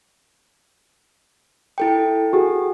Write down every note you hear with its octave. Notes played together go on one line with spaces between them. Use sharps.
E4 A4 G5
F#4 G#4